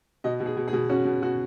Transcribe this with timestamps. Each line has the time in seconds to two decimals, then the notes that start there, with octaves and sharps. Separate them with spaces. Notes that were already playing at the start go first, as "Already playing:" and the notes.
0.24 B2 D#5
0.40 B2
0.46 G#4
0.57 B2
0.68 G#4
0.73 B2
0.89 C#4 F#4
1.05 B2
1.22 B2 F#4